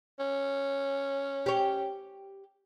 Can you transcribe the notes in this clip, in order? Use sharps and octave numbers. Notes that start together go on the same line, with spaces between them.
C#4
G4 C#5